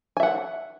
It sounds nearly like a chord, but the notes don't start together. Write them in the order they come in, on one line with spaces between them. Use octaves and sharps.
G#5 E5 F#5